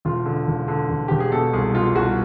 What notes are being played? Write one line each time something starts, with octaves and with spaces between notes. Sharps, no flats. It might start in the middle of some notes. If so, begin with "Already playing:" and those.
E1 F4
D3
E1
D3
E1
E1 G4
G#4
B2 A4
C2 G#4
B2 F4
C2 F#4